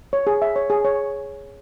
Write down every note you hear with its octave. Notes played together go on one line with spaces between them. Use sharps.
C#5
G#4
E5
C#5
G#4
C#5